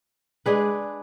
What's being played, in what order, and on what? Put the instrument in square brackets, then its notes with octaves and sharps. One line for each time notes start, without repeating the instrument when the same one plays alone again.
[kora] G#3 D4 G#4 B4